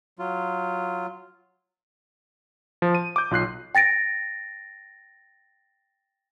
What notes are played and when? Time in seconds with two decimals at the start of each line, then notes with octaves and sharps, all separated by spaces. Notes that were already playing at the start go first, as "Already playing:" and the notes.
0.19 F#3 F4
2.82 F3
2.95 D#7
3.16 D6 G6
3.31 B1 F4 F#6 C7
3.75 G5 A6 A#6 D7